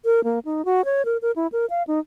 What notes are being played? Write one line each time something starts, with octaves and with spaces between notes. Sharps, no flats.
A#4
A#3
D#4
F#4
C#5
A#4
A#4
E4
A#4
F5
D#4